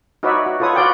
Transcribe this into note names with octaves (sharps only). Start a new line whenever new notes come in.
D#4 F#4 B4 C#5 D5 E5
F#4
F4 A4 B4 C#5 D#6
F4 F#4 B4 D5 G5